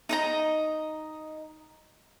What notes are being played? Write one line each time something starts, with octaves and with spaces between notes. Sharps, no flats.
D#4 D#5 A#5